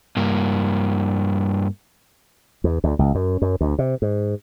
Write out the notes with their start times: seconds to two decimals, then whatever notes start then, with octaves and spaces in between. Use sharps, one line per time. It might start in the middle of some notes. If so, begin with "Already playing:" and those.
0.17 G2 A#3
2.64 E2
2.84 D2
2.99 C#2
3.15 F#2
3.42 F#2
3.61 D2
3.79 C3
4.02 G#2